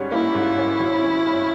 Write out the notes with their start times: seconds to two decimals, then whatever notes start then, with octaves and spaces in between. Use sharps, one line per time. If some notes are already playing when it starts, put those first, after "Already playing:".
Already playing: G#2 G3 C#4
0.12 A#3 E4
0.35 G#2
0.57 C#4
0.80 G#1
1.03 C#4
1.25 G2